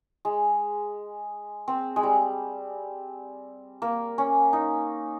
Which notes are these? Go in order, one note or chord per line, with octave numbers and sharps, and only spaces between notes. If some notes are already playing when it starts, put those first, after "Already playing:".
G#3
C4
G#3
G3
A#3
C#4
D#4